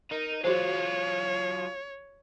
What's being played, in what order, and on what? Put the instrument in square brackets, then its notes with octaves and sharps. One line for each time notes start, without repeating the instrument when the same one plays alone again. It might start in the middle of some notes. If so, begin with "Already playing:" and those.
[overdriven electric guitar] D#4 [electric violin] A#4
[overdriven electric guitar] F#3 F4 [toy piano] F#4 G#4 C5 [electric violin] C#5